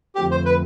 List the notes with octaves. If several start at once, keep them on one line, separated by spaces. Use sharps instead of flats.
F2 D3 F3 A3 C4 G4
C5
B4